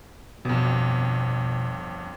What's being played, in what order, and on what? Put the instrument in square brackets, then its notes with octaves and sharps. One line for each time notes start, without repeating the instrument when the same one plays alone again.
[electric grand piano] G1 F2 [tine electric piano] B2